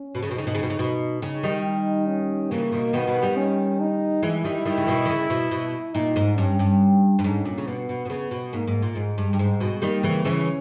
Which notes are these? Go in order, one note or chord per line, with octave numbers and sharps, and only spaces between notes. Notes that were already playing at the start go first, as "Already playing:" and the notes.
Already playing: C#4
B2
C#3
B2
C#3 D#4
B2
C#3
B2
C#3
B2
C#3 D#4
D#3 G3
D#4
C#4
C#3 E3 A#3
B2 D#3
B2 D#3 B3
B2 D#3
D#3 G3
C#4
D#4
E3 G#3 E4
D#3 G3
D#3 G3
C#3
B2 D#3
D#3
C#3
B2
B2
A#2 D#4
G#2
G2 C#4
G2
G2
G#2 C#4
A#2
C#3
B2 B3
B2
B2
C#3 B3
B2
G#2 A#3
G#2
A#2
G#2 G#3
G2
G2
G#2 G#3
B2
D#3 G3 A#3
C#3 E3
C#3 E3 C#4